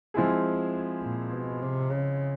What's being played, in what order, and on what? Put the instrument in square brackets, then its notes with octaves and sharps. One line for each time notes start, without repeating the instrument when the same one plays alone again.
[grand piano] F3 G#3 C4 E4 G#4
[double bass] A#2
B2
C3
C#3